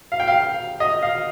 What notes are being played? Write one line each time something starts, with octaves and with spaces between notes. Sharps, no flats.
F5
G5
F5
D#5
F5